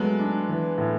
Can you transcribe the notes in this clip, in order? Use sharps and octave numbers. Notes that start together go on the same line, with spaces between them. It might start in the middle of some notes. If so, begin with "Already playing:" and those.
Already playing: F#3 G#3 A3 B3
D4
E3
A2